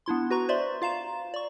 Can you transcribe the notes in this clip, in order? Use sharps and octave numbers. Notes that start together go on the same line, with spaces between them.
B3 D4 E4 C6
F#4 B4 A#5 C#6
C5 D5 E5 C6
F4 F5 A#5 E7
D5 C#6